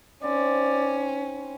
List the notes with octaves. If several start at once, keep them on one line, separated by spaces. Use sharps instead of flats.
C4 C#4 D#4 E4 D5